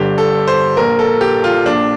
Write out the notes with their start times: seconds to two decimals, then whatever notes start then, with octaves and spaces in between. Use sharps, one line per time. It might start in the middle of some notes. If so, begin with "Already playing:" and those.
Already playing: G1 G2 D3 G4
0.18 A4
0.48 C5
0.77 A#1 A#2 A#4
0.99 A4
1.21 G4
1.44 F4
1.65 A#1 A#2 D4